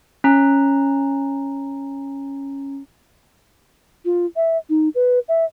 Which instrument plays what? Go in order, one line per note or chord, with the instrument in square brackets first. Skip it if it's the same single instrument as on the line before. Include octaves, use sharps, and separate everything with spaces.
[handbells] C#4 A#5
[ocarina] F4
E5
D#4
B4
E5